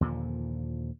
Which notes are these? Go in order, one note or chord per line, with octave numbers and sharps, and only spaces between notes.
D#2 A#2 D3 F3